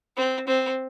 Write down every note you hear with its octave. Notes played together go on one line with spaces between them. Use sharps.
C4
C4